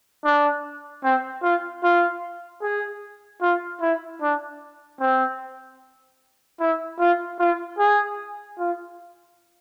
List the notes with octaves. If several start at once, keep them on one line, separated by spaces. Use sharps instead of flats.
D4
C4
F4
F4
G#4
F4
E4
D4
C4
E4
F4
F4
G#4
F4